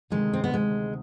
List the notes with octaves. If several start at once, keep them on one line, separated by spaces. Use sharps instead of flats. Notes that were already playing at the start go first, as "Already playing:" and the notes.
D2 C3 D#3 G#3
C4
B3
G#3